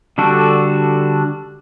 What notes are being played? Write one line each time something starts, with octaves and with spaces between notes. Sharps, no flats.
D3 G3 D4 F#4 A4